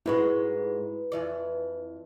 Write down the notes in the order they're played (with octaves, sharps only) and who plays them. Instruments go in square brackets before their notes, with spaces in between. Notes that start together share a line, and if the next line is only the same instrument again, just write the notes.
[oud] G#2 G#3 F#4 [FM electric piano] E4 B4
[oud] F2 E3 D5